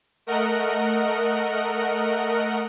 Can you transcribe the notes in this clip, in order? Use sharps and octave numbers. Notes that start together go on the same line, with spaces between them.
A3 A#4 D#5 F#5